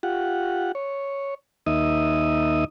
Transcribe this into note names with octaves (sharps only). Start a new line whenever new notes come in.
F4 G4 F#5
C#5
D#2 A#3 D#4 D#5 E5 D#6